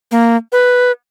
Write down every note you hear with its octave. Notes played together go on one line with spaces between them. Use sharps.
A#3
B4